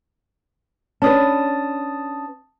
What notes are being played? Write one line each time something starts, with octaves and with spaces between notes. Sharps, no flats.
C#4 D4 B4 A5 D#6 A6